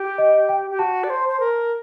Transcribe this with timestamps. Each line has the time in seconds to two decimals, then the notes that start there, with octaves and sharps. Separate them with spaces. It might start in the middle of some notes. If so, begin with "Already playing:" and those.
Already playing: G4
0.18 D#5
0.49 G5
0.70 G4
0.79 F#4 A5
1.04 D5
1.10 C5
1.28 C5
1.40 A#4